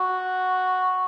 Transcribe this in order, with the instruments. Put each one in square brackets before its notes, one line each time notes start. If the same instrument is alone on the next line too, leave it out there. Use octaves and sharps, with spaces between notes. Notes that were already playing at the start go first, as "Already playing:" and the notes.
Already playing: [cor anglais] F#4